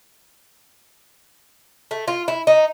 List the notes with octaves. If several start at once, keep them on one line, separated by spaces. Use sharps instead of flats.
A3
F4
E4
D#4